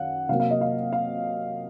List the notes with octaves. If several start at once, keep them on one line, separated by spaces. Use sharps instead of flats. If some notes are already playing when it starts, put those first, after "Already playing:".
Already playing: F#2 D#3 F5 F#5
C3 F#3 A#3 F5
F5
D#5
F5
F5